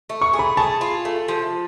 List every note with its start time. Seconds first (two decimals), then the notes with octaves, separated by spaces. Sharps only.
0.09 A3
0.21 C#6
0.33 G#4
0.39 B5
0.57 G#4 A5
0.81 F4
1.05 A3
1.28 F3